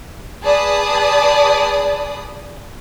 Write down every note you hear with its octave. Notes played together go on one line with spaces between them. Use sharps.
G#4 B4 D5 A5 D#6